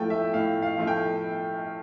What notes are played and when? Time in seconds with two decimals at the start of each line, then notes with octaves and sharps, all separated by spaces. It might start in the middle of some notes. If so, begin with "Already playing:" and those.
Already playing: A2 F3 A3 G5
0.10 E5
0.33 A2 F5
0.62 F5
0.78 F3 A3
0.87 G5